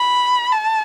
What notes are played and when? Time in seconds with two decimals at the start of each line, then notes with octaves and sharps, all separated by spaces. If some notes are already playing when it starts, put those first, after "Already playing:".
Already playing: B5
0.52 A5